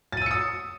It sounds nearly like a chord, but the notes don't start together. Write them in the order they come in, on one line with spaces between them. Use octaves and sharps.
A6 D#7 E6 C#7 D#6